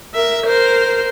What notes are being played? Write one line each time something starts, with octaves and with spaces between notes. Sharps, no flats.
A#4 E5
A#4 C5